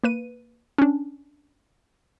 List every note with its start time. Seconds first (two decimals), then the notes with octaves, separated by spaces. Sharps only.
0.04 A#3 B4 D#7
0.78 C#4 D4